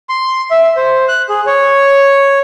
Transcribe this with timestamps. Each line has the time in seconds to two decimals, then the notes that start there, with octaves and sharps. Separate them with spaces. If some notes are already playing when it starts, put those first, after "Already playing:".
0.09 C6
0.51 E5
0.76 C5
1.08 F#6
1.29 G#4
1.47 C#5